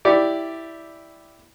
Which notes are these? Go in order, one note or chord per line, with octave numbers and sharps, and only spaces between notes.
E4 G4 D5